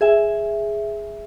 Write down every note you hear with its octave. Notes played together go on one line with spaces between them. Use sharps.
G#4 E5 G#5